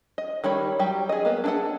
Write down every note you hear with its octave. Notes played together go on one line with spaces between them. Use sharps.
D#5
D#3 G3 C#5 B5
F#3 G3 G4
G#4 D#5
A#3 B3
D4 E4 G#4 A4 F#5